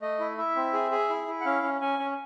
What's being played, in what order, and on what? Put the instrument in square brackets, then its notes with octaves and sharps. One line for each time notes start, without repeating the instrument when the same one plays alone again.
[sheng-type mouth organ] A3 D#5
E4
E4 E5
C4
G#4
G#4
E4
E4
F#5
C#4 F5
C#4
C#4 G#5
C#4